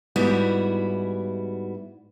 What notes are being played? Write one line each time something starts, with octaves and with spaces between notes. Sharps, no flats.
G#2 G3 B3 E4 F#4